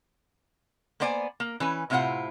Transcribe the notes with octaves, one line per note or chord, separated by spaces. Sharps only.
A#3 B3 C5 D5 G5 G#5
A#3
E3 C#4 B4
A2 C3 E4 F4 C5 F#5